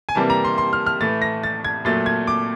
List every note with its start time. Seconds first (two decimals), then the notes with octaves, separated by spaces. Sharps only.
0.09 G#5
0.15 C3 E3 G3 A#3 A5
0.30 A#5
0.45 C6
0.58 C6
0.73 F6
0.86 F6
1.00 A2 E3 A3 A6
1.22 A#6
1.43 A6
1.64 G#6
1.85 A#2 F#3 A3 A6
2.06 G#6
2.27 D6